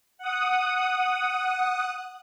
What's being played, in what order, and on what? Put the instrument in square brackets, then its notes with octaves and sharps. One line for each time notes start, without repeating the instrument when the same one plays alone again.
[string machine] F#5 D#6